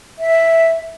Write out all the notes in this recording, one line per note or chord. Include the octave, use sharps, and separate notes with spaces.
E5